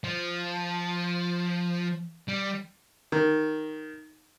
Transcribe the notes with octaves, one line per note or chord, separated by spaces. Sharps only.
F3
G3
D#3